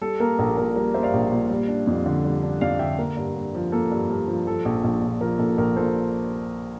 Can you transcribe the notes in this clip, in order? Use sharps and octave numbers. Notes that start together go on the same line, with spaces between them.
G3 A4
A#3 A#4
A#1 A4
A#2 A#4
G3 A#4
A#3 C5 E5
D5 F5
A#1
A#2
G3
D4
F2
D3
G3
D4
F2 D5 F5
D3 E5 G5
A#3 A#4
G2
G2
F3
A#3 A4
G2
G2
F3
F3 A4
A#1
A#1
A#2
F3 A#4
A#1 A4
A#1 A#4
A#2 A4 C5